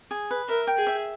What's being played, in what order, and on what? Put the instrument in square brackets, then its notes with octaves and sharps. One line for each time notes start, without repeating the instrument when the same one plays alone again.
[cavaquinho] G#4
B4
[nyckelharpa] A#4 [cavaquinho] E5
[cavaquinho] G5
[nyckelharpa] G#4
[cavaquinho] E5